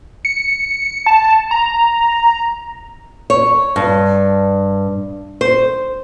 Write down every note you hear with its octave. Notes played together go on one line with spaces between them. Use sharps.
C#7
A5
A#5
C#5
G2
C5